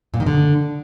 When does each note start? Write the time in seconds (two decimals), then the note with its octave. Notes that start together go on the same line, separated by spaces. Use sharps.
0.14 A#2
0.20 D#3
0.26 D3